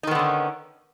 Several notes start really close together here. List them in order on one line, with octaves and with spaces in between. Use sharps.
D#4 D#3 B3 D3 C#4